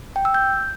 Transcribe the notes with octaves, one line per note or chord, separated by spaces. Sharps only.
G5
E6
G6